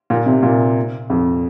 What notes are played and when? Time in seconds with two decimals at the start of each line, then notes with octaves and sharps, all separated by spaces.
0.10 A#2
0.26 C3
0.43 A#2
1.10 F2